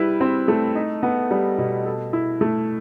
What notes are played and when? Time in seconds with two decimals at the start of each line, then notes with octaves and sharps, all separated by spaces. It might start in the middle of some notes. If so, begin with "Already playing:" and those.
Already playing: G3 E4 B4
0.21 C4
0.48 A3
0.75 D#4
1.03 B3
1.31 G3
1.58 B2
1.85 A4
2.13 E4
2.41 A3